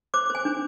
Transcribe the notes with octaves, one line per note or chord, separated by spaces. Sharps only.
C5 D6
C5 G#5
D4